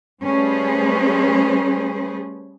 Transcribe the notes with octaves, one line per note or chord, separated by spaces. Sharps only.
G3 A3 C#4 G#4 B4 C5